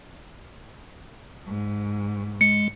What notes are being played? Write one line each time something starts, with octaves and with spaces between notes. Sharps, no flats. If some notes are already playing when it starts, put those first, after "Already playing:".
G#2
G#3 C#7